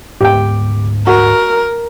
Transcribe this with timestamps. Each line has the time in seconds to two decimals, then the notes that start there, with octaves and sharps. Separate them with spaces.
0.21 D2 G#2 B3 G4 G5
1.07 F#4 A#4